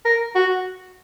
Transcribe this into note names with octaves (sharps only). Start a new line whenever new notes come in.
A#4
F#4